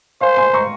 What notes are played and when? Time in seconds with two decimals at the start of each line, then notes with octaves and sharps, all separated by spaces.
0.21 C5 F5 G#5
0.37 G#5 C6
0.54 A#5 C#6